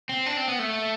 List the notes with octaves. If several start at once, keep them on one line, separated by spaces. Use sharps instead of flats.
C4
D4
C4
B3
A3